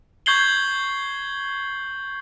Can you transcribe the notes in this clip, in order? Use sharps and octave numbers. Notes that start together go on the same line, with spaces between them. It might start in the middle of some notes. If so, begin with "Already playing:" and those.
C#6 G6 G#6 C7 F#7 G7